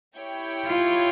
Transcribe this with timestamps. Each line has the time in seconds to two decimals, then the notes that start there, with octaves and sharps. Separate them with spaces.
0.16 E4 G4 C#5 G5
0.66 F4